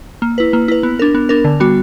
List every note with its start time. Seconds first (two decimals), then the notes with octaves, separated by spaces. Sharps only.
0.22 A#3
0.38 E4 B4
0.53 A#3
0.68 E4 B4
0.83 B3
0.99 D4 A#4
1.15 B3
1.29 D4 A#4
1.45 D3
1.60 G3 B3 F#4